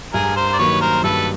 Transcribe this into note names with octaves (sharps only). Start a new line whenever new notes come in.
G2 G#4 A#4
A#4 C5
D5
D#3 F#3 A#3 B4 C#5
A#4 C5
G2 A4 B4